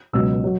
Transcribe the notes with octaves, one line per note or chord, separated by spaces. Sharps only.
C#2 B2 F#3 E6
F#3